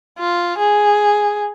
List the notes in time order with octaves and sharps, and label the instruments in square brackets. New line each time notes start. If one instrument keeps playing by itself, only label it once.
[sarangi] F4
G#4